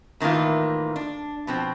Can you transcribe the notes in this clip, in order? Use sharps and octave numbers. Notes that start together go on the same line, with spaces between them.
A2 D#3 E3 A#3 F4
D4
B2 F3 C4